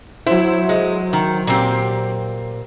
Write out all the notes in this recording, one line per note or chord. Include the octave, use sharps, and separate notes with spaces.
F#3 E4 C5
G#3
D#3
A#2 C4 G4